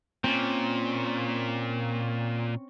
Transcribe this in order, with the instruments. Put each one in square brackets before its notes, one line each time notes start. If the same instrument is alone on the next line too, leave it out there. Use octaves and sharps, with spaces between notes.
[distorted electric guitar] A#2 [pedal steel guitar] C4 C#4